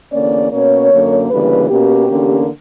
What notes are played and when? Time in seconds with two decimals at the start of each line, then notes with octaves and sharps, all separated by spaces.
0.12 E2 D3 A#3 C#4 D5
0.51 B2 A#3 C#4 C#5
0.90 F#2 D3 A#3
1.29 D2 C#3 E3 G3 A#3 B4
1.69 B2 A#3 C#4 G4
2.08 E2 D3 A#3 C#4